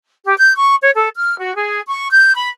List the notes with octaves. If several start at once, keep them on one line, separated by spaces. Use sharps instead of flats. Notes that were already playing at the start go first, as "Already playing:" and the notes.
G4
G6
C#6
C#5
A4
F6
F#4
G#4
C#6
G6
B5